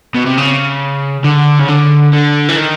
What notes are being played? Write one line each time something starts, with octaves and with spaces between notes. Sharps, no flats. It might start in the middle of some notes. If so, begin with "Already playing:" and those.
B2
C3
C#3
D3
C#3
D3
D3
E3
D#3